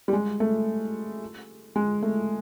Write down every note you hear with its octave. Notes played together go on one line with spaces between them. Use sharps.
G3
G#3
A3
G#3
A3